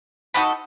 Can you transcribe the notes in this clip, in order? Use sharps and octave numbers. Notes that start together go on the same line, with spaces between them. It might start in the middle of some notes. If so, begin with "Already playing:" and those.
D#4 F#4 A4 B5 D#6